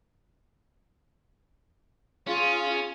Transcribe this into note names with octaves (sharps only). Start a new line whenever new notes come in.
C#4 F4 G#4